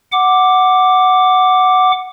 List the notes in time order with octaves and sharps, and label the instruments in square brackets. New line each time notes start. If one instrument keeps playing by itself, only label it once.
[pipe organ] F#5 D6